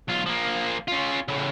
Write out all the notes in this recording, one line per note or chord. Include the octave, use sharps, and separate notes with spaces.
B1 F4
F3 A#3
C#4 F4
A2 C#3